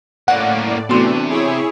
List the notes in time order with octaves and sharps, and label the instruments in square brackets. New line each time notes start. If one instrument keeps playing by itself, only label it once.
[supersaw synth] A2 D5 [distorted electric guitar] A#3 C#4 [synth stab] F#5
[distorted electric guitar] C3 [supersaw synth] E3 A3 D4 [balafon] B3 F#4 C6
[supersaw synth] E4 G#4 C#5